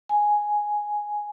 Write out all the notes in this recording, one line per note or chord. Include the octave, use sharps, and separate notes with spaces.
G#5